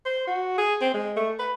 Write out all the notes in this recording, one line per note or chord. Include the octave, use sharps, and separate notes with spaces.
C5
F#4
G#4
C4
G#3
A3
B4